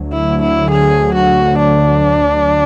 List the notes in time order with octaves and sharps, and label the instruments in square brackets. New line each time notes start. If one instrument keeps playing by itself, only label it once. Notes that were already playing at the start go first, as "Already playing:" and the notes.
Already playing: [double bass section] D2 D3 F#3
[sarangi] E4
E4
G#4
F#4
D4